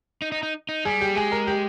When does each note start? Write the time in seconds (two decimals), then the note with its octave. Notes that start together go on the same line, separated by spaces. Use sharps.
0.22 D#4
0.32 D#4
0.43 D#4
0.69 D#4
0.85 G3 G#4
1.01 G4
1.16 G#3 G#4
1.32 A#4
1.47 G4